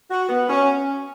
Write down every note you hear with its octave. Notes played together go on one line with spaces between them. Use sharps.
F#4
B3
C#4